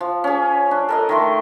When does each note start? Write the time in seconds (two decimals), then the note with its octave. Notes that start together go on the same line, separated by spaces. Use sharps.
0.01 F3
0.24 C#4 G#4
0.71 D4
0.89 A4 A#4 D#5
1.09 D#3 A3 C6